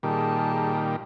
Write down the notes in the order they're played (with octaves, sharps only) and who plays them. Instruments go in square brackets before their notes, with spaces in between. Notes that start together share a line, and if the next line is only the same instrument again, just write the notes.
[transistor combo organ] A#2 D#3 G3 [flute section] G#4 A5